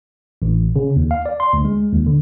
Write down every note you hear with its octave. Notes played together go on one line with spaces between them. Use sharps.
A1
C#3
D#2
F5
D5
C6
D2
G#3
D#2
D3